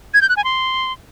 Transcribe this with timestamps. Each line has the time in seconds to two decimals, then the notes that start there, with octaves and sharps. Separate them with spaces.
0.14 G#6
0.22 G6
0.29 F#6
0.37 G#5
0.44 C6